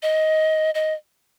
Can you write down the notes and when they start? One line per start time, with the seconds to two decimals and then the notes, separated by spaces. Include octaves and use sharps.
0.02 D#5
0.75 D#5